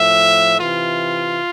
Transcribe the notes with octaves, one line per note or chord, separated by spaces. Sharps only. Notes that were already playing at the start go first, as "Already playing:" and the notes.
Already playing: A2 F3 E5
C3 E3 F4